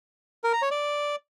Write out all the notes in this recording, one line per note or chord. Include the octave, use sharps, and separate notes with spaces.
A#4
A#5
C#5
D5